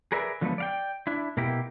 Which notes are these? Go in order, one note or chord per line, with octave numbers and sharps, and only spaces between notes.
G#4 A#4 B4 D5 E5
D3 F3 F#3 G#3 A3 B3
D5 F5 G5
D4 E4
B2 A#3 E4 G4